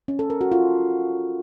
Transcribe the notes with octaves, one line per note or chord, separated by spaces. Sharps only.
C#4
A4
A#4
F#4
F4